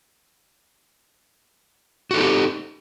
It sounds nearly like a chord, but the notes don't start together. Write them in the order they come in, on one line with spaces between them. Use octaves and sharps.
F#4 A4 D#4 G4